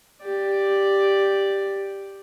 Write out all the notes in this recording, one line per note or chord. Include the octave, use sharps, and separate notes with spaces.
G4 D5